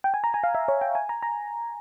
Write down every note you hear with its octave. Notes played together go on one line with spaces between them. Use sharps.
G5
G#5
A#5
G#5
F5
E5
C#5
G5
G#5
A#5
A#5